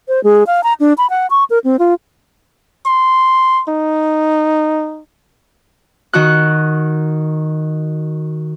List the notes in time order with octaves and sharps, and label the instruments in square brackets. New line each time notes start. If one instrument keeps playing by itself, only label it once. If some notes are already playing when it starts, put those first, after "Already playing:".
[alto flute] C5
G#3
F5
A#5
D4
B5
F#5
C#6
A#4
C4
F4
[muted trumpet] C6
D#4
[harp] D#3 F#4 F#6